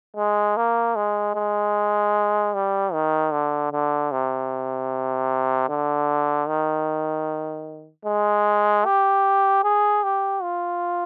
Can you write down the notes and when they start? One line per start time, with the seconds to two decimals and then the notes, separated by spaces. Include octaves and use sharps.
0.17 G#3
0.57 A#3
0.96 G#3
1.35 G#3
2.54 G3
2.93 D#3
3.32 D3
3.72 D3
4.12 C3
5.69 D3
6.48 D#3
8.06 G#3
8.85 G4
9.64 G#4
10.03 G4
10.42 F4